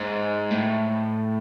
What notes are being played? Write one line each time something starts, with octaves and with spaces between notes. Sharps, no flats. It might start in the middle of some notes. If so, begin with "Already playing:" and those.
Already playing: G#2
A2